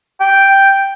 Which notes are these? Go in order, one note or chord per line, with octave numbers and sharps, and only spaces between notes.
G5